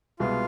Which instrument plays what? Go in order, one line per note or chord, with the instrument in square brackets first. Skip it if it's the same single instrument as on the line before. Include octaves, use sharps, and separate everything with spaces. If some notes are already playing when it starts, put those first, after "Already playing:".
[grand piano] C2 B2 G#3 B3 [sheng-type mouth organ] F4